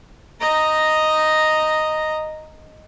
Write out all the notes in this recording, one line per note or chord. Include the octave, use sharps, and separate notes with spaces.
D#5 A#5